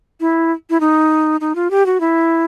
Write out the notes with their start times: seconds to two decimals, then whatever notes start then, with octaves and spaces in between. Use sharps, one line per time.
0.20 E4
0.70 E4
0.80 D#4
1.41 D#4
1.55 F4
1.71 G4
1.86 F#4
2.00 E4